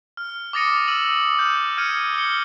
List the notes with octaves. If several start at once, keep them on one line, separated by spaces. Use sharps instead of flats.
F6
D6 D#6 A6 A#6 C#7 D#7
E6 D#7 F#7
F6 G6
F6 G6 G#6 C#7 D#7
C#7 G7